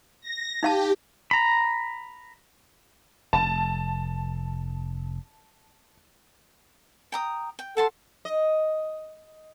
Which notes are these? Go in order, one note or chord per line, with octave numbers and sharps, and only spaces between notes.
A#6
D#4 G4 F5 A5
A#5 B5
F1 A5
G5 A#5 D#6
G5
A4 F#5 A5 C6
D#5